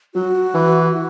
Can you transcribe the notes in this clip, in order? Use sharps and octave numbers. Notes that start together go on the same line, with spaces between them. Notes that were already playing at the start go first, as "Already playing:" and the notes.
F#3 F#4
E3
F#4